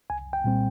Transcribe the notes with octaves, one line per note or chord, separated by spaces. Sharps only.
C2 G#5
G5
A#2 G3 C4